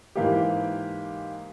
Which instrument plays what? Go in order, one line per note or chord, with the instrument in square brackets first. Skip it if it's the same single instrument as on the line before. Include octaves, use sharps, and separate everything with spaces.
[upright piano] G#2 E3 A#3 G4